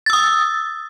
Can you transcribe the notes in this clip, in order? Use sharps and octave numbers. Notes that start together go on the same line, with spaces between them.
D#6 E6 A6